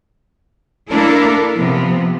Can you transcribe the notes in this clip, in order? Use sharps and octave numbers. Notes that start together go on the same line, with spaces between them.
A#3 D4 E4 A4 A#4
C3 F3 B3